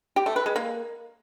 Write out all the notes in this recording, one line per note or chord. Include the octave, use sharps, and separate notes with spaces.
G4
A3
B4
G#3
A#3